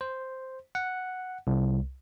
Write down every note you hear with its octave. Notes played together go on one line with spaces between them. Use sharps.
C5
F#5
C2